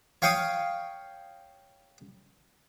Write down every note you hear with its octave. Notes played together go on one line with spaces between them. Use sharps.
C#5 F5 G5 C#6 D#6